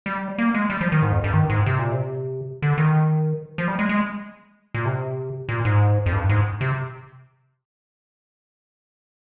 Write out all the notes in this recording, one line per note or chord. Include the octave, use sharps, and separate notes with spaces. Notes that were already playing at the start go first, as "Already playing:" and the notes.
G3
A#3
G#3
G3
F3
D#3
G#2
F2
G2
D#3
G#2
C3
A#2
C3
D3
D#3
F3
G3
G#3
G#3
A#2
C3
A#2
G#2
F2
G2
G#2
C3